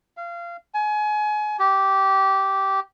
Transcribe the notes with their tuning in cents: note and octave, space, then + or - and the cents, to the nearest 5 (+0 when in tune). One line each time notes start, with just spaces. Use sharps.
F5 -25
G#5 +30
G4 -15